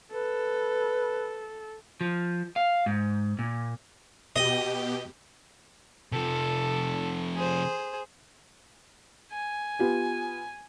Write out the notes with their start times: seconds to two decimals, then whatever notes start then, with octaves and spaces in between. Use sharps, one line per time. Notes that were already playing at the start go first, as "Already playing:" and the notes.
0.12 A4 B4
2.01 F3
2.56 F5
2.86 G#2
3.39 A#2
4.36 B2 G4 D#5
6.12 C3 F3 A4
7.35 G#4 C5
9.32 G#5
9.79 B3 F4 G4